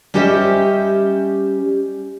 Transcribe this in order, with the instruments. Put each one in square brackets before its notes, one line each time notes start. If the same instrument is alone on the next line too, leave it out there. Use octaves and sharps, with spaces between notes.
[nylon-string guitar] G3 C#4 G4 C5 D#5 E5